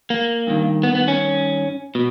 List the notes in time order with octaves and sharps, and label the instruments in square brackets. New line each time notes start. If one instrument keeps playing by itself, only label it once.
[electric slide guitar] A#3
G2 D#3
B3
B3
C#4
B2